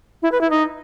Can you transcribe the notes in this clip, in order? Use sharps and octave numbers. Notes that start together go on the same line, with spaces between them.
E4
B4
E4
D#4